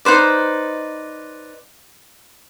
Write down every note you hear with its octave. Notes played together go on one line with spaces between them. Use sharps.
D#4 B4 C5 D5